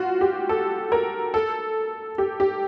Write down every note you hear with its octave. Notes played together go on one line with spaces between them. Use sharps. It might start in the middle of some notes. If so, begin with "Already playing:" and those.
Already playing: F4 F#4
G4
A4
A#4
A4
G4
G4